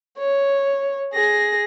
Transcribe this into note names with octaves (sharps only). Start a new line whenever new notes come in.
C#5
G#4 A#6